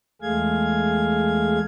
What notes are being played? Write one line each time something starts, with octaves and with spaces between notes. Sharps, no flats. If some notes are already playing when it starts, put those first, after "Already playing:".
E2 G#3 A3 G#4 F5 G#6